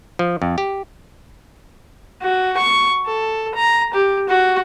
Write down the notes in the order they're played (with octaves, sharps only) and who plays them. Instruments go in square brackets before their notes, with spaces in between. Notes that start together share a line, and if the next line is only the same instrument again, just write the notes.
[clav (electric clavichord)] F3
F2
G4
[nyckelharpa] F#4
C#6
A4
A#5
G4
F#4